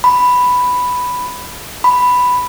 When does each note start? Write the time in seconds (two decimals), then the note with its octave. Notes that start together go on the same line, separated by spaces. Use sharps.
0.04 B5
1.84 B5